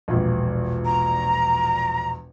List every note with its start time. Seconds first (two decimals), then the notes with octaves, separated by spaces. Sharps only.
0.08 E1 A#1
0.85 A#5